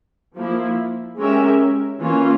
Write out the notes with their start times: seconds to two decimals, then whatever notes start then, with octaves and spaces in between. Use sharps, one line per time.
0.36 F3 A#3 E4
1.18 G#3 C#4 G4 A#4 E5
2.00 E3 A#3 C#4 F4